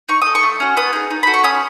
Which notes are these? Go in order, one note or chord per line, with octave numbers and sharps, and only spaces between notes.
D#4 C#6
A4 D#6
C#6
A3
C#4 F#4
B3 D#6
D#4 G#4
D#4
F#4 A4 B5
C#6
C#4 D#6